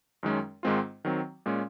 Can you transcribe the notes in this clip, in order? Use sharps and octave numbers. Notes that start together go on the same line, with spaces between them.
F#2 D#3 G#3 C#4
G#2 D#3 G#3 C4 F4
D#3 F#3 C4
A#2 G#3 C#4